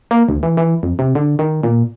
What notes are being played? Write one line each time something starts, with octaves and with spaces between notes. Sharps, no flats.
A#3
D2
E3
E3
F2
C3
D3
D#3
A#2